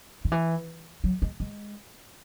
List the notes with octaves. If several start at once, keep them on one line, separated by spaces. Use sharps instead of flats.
D#3
E3
F#3
G#3
G#3